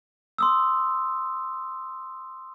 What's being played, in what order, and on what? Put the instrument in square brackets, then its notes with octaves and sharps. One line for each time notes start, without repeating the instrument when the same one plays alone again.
[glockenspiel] C6 D#6 E6